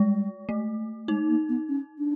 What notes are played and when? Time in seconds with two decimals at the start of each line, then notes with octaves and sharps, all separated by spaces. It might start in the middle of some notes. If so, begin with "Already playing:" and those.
Already playing: G3 G#3
0.49 A3
1.08 G#3 D#4
1.28 A#3
1.49 B3
1.69 C#4
1.98 D4